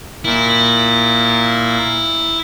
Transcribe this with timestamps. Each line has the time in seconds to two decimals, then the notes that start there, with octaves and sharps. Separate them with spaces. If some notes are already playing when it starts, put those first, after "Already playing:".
0.25 A#2 E4